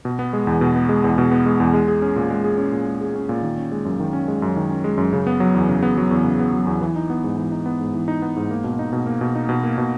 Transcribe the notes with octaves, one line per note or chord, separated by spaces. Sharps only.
B2
B3
G#3
E2
B2
B3
G#3
E2
B2
B3
G#3
E2
G#3
G#4
C#4
A#2
G#3
G#4
C#4
A#2
G#3
G#4
C#4
A#2
D#3
C#4
G#3
F#2
D#3
C#4
G#3
F#2
D#3
C#4
G#3
F#2
C#3
B3
F#3
E2
C#3
B3
F#3
E2
C#3
B3
F#3
E2
E3
D#4
B3
G#2
E3
D#4
B3
G#2
E3
D#4
B3
G#2
A#3
B2
D#4
B2
A#3
B2
D#4
B2
A#3
B2